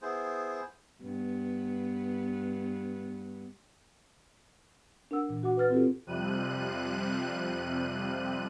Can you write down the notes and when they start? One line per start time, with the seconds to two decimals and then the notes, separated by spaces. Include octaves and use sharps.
0.02 B3 E4 G#4 C5
1.02 G2 B3
5.11 D4 A#4 F#5 E6
5.29 A#2 E3
5.43 F#4 F#5 D6
5.57 B4 F#5 F6 A6
5.70 C4 F4 G4 A4
6.06 F2 C3 F3 G3 F#6 D#7